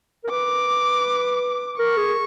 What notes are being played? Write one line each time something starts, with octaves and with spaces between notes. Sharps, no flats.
A#4
B4 D6
A#4 C#6
G#4